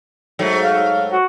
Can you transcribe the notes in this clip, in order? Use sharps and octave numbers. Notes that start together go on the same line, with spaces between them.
G#2 F#3 A3
F5
F#4